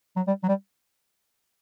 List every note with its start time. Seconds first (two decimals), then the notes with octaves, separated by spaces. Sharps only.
0.17 F#3
0.27 G3
0.43 F#3
0.48 G3